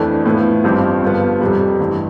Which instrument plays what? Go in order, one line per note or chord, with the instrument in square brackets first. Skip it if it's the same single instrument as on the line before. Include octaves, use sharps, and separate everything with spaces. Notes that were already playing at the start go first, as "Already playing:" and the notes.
Already playing: [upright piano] F2 E3 A3 D4 A4
A2 F3 B3 E4
A1 G2 F3 C4 G4
G1 G2 F3 B3
F2 C3 G3
A1 G2 E3